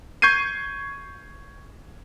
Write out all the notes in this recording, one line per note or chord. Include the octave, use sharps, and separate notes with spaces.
C#6 G6 G#6 C7 D#7